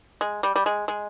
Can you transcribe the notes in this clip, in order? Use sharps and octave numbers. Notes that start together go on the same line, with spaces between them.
G#3
G3
G3
G#3
G#3